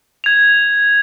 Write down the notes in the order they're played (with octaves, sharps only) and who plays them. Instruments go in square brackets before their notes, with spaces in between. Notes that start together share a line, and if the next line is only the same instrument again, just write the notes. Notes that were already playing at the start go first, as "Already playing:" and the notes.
[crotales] G#6 F7